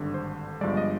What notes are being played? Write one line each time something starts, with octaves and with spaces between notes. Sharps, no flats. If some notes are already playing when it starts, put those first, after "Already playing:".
Already playing: G#1 G2 D3
C5
G1 G2 F3 G#3 D5
D#5